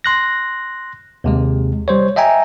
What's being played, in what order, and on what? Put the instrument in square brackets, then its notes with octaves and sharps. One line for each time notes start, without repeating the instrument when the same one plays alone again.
[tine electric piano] C6 F#6 A#6
D#2 C3 G#3
G3 C5 C#5
D#5 E5 G5 G#5 A#5